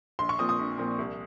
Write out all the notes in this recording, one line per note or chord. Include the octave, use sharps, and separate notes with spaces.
A#1 C6
C#6
A#2 F3 C4 D#6
D#6
A#1
A#2 F3 C4
C2